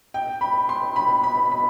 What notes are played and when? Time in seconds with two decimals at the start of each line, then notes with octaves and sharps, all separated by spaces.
0.14 G5
0.41 B5
0.69 C6
0.96 B5
1.23 B5
1.51 B5